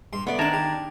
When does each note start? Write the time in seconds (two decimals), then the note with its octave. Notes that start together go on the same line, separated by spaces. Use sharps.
0.13 G2 C6
0.27 A3 B3 D5
0.39 C3 D#3 D4 A5 A#5 D6 G#6
0.54 G4